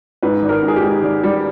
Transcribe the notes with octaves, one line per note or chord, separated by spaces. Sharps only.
G#2 B4
G#1
A#4
G#2
G#4
G4
G#2
G#1
G3